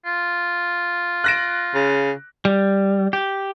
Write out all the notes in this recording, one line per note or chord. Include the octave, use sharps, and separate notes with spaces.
F4
F#6 A#6 D7
C#3
G3
G4